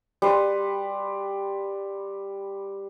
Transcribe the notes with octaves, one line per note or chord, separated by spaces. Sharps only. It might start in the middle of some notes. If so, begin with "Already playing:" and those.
G3 B4 C6